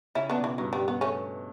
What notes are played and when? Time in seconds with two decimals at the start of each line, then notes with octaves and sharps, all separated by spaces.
0.15 C#3 C#4 E4
0.30 B3 D4
0.37 B2
0.44 E3
0.58 G2 F#3
0.73 G3
0.88 B3
1.01 A3 C#4